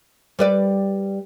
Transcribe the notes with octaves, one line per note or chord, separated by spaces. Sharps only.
G3 B4 D5